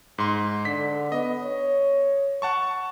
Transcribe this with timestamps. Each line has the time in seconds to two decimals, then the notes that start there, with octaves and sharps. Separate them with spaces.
0.18 G#2 C6
0.65 D3 B6
1.12 B3 D#5
1.43 C#5
2.42 F#5 A5 C#6